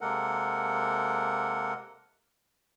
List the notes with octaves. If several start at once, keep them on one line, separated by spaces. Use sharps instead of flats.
C3 G#3 A#3 A4 A#4 F#5